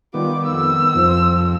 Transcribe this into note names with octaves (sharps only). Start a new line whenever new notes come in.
D#3 G3 B3 F4 D6
F2 E6
C2 F2 F3 C5